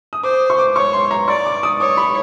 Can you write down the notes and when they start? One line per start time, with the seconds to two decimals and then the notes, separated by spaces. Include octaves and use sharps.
0.13 D#6
0.23 C5 D6
0.50 C#6
0.58 D6
0.76 C#5 C#6
0.93 C6
1.11 A#5
1.28 D5 C#6
1.45 D6
1.63 D#6
1.80 C#5 D6
1.97 B5